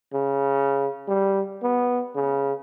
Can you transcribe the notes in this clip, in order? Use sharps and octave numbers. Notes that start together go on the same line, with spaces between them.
C#3
G3
B3
C#3